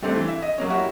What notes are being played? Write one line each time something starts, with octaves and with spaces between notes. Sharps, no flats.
G3 A3 C4 D4
E3
E5
D#5
F#3 A#3 C#4
E4 F#4 G4